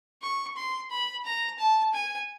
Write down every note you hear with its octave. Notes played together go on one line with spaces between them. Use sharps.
C#6
C6
B5
A#5
A5
G#5